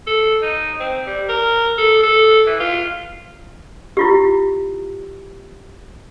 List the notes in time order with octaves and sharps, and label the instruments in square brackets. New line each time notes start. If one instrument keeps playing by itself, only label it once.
[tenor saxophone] A4
D#4
C4
G3
A#4
A4
A4
E3
F4
[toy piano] E4 F4 G4